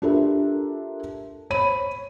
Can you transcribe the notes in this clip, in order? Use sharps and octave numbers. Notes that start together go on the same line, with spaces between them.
D4 F4 G4 A4 A#4 E5
C5 C#5 B5 D#7